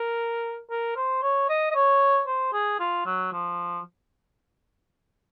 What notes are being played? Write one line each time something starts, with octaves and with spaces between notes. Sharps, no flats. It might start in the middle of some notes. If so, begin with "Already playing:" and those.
Already playing: A#4
A#4
C5
C#5
D#5
D#5
C#5
C5
G#4
F4
F#3
F3